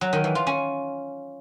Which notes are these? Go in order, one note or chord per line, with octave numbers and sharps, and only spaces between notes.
F#3
D#3
E3
F4
C#4